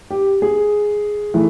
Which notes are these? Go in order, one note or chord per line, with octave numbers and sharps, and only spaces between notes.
G4
G#4
E3 A3